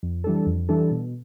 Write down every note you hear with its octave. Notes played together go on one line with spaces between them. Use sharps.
F2
E3 G3 D4 A4
F2
E3 G3 D4 A4
B2